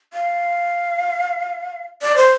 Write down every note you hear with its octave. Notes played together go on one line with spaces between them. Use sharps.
F5
D5
C5